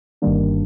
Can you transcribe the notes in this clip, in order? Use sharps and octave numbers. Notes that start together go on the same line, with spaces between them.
G1 G2 D#3 G3 A#3 D4